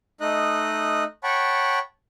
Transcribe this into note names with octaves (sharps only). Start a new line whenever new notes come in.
A3 D#4 D#5 F#6
C#5 F#5 G5 A5 B5 C#6